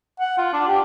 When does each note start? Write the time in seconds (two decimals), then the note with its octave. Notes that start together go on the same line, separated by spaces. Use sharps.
0.20 F#5
0.38 F4
0.53 D4
0.67 G4